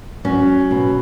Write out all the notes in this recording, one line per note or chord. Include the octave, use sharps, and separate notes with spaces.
F#3 C#4
B2